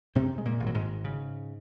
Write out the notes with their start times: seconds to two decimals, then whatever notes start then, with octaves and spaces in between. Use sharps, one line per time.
0.15 F#2 C3 C4
0.38 G#3
0.45 A#2 A#3
0.60 G#1
0.66 F#3
0.75 G#2 G#3
1.04 C#3